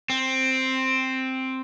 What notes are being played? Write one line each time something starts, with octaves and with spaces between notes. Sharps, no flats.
C4